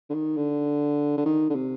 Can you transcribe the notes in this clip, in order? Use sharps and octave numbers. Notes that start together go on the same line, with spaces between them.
D3
D#3
D3
D3
D#3
D3
C3